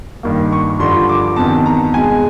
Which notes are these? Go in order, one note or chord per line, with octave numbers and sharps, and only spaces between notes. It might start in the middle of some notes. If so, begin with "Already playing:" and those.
G2 D#3 G3 A#3
C#6
G2 D3 F3 C6
D6
E2 C3 D#3 A5
A#5
B2 G#3 G#5